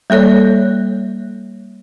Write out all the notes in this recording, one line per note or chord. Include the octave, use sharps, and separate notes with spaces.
G3 A#3 A4 C#5 D5